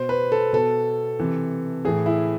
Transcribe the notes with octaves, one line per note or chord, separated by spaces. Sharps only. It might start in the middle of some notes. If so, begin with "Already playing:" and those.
Already playing: B2 C5
B4
A4
B2 A4
C3 E3
A2 E3 G#4
E4